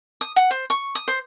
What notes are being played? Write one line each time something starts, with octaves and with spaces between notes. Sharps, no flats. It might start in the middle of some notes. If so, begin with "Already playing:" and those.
D#6
F#5
C5
C#6
D#6
C5